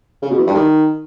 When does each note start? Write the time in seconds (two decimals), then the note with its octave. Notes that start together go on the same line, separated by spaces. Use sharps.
0.22 C#3
0.31 B2
0.39 E3
0.47 G2
0.55 D#3